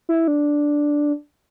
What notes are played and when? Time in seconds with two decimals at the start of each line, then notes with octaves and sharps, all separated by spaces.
0.09 E4
0.28 D4